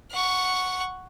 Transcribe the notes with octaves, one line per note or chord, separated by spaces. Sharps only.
F#5 C#6